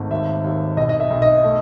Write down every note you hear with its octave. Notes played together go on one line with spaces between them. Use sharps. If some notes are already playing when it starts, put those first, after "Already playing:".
Already playing: G#1 A3
D#2 E5
D#2
B1 D#5
D#5
E5
B1
D#5
A3